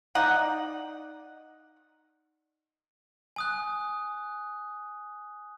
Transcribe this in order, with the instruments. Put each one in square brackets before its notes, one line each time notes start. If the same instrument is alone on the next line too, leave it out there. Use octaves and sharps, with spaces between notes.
[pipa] D#4 D5 D#5 F#5
[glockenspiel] G#5 D#6 F#6